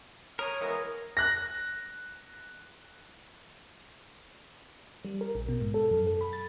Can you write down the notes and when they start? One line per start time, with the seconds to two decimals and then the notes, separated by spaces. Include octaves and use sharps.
0.39 A#4 C#5 D#6
0.61 E3 G#3 B3 A#4
1.17 F#6 A#6
5.05 G3
5.21 A#4
5.35 A#1
5.49 B2
5.61 G#2
5.74 A4
5.91 F#2
6.07 A4
6.21 B5
6.33 A6